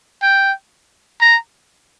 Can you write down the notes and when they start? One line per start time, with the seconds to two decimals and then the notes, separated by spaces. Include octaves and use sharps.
0.22 G5
1.21 A#5